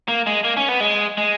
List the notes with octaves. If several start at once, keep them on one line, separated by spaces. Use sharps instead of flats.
A#3
G#3
A#3
C#4
B3
G#3
G#3